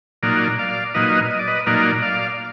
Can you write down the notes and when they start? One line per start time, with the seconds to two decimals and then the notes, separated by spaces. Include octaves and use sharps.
0.23 A#2 F#3 A#3 D#4 A#4 D5
0.59 D5 F5
0.94 A#2 F#3 A#3 D#4 B4 D#5
1.31 D#5
1.39 D5
1.47 B4 D#5
1.66 A#2 F#3 A#3 D#4 A#4 D5
2.02 D5 F5